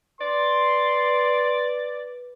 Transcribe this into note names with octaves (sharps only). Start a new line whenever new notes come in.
B4 D5 C6